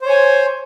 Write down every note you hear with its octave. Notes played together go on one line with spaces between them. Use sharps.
C5 C#5 G#5